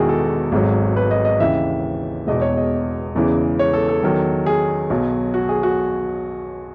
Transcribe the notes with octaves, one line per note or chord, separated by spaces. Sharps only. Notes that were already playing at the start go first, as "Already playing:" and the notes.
Already playing: E1 E2 D#3 E4 F#4 G#4
A4
G#1 G#2 F#3
B4
D#5
D#5
D#2 C#3 E3 E5
E1 E2 B2 D#5
C#5
D#5
E1 E2 C#3 E3
C#5
A4
A4
E2 D#3 F#3
G#4
B1 B2 F#3
F#4
G#4
F#4